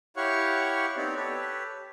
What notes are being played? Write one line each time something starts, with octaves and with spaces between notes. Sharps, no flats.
E4 G4 C#5 F5 F#5 C#6
B3 C4 D#4 G4 C#5 D5
G4 A4 B4 C#5